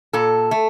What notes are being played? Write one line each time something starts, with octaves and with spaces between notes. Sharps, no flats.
A#2 A4
A3